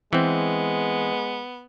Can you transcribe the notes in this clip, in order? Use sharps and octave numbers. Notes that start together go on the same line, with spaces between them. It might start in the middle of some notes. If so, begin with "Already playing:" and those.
E3 G#3 B3 C4